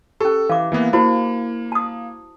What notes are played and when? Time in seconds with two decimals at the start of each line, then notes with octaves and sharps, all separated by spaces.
0.20 C#4 G4 A4
0.49 E3 F5 D6
0.72 E3 A#3 B3
0.93 A#3 E4 F#4 C5
1.72 A5 D#6